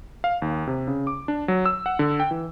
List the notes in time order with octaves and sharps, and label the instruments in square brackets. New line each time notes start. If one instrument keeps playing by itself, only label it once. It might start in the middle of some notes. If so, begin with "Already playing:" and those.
[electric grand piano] F5
D#2
C3
C#3
D6
D4
F#3
E6
F#5
D3
G5
E3